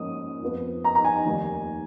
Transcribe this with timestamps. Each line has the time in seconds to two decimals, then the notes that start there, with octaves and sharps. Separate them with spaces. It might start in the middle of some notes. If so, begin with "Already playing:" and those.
Already playing: G#2 F3 A#3 C#4 D#6
0.42 F2 F3 B3
0.84 A#5
0.95 A#5
1.04 G#5
1.25 F1 D#2 D#3 A#3 D#4